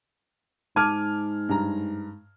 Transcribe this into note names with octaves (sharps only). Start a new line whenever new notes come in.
G#2 A5 D6 F6 G#6
G2 A#5